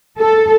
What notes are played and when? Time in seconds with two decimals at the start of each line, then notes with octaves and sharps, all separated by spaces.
0.18 A4